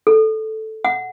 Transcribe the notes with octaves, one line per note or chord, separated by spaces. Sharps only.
A4
F#5